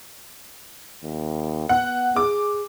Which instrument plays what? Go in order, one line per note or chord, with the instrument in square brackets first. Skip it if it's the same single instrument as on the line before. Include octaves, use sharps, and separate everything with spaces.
[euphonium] D#2
[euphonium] B3 [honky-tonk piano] F#5
[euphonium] G#4 [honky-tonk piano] D6